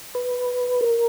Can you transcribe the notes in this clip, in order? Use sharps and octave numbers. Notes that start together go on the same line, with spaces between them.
B4
A#4